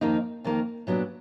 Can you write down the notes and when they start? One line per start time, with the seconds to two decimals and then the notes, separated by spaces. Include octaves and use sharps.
0.01 F2 D#3 A#3 D#4
0.44 F2 D#3 A#3 D#4
0.87 A#2 F#3 B3 D4